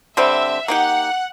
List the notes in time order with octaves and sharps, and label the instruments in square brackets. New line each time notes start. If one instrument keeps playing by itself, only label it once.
[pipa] D3 G3 C4 [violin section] E5
[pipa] A#3 D#4 G4 [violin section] F#5